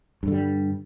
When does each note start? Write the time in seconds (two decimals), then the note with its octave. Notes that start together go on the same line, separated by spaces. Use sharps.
0.23 G2
0.28 D3
0.32 G3